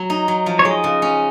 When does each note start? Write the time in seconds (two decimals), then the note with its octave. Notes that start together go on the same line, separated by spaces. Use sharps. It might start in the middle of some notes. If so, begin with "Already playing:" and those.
Already playing: F#3
0.10 D#4
0.28 F#3
0.46 F3
0.59 C#5
0.65 G#3
0.71 D#5
0.84 C#3
1.02 C#4